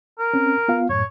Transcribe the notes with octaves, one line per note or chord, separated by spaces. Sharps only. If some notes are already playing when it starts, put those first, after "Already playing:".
A#4
C4 C#4
B3 F4 F5
F#2 A2 C#5